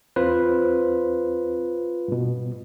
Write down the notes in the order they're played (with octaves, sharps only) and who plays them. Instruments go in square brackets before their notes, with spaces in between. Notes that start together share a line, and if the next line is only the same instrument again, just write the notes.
[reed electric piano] E2 C4 C5 [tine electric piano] F4 B4
[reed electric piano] G2 B2